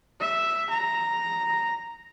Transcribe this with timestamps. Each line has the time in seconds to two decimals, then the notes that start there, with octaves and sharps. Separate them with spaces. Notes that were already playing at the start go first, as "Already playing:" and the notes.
0.21 E5
0.70 A#5